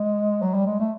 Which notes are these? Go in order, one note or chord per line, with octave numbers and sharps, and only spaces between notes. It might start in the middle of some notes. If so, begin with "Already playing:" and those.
Already playing: G#3
F#3
G3
G#3
A3